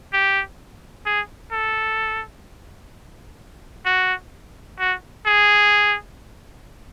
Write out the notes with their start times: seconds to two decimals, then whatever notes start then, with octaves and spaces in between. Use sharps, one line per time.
0.13 G4
1.06 G#4
1.52 A4
3.86 F#4
4.79 F#4
5.26 G#4